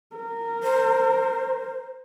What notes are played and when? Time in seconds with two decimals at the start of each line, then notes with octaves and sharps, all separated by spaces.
0.16 A#4
0.63 C5